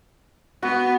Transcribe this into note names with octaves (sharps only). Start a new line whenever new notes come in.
B3 F#4